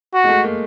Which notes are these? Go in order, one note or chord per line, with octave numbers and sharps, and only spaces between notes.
F#4
G#3
A3
A#3